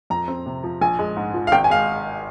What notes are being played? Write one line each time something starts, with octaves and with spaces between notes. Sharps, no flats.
F2 A#5
C4
C3
F3
A#1 G#5
G#3
G#2
F3
F5
G#1 G5
G#5
G#3 F5